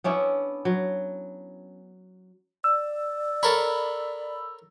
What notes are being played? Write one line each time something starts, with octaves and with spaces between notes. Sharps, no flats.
B3 C#4 D4 E4
F#3
D5 E6
A4 A#4 C#5 B5